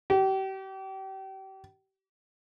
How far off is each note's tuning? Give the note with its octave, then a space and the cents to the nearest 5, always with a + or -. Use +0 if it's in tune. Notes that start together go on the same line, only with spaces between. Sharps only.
G4 -35